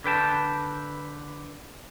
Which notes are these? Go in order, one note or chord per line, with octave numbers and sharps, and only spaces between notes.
D3 B4 G5 A5